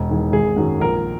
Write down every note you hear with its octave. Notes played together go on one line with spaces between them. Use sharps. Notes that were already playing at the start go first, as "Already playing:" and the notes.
Already playing: E1
E2 D#3 G#3
G#1 G#4
F#2 D#3 F#3
A#1 A#4